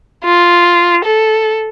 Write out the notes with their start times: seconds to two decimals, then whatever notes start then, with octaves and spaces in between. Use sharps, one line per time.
0.25 F4
1.05 A4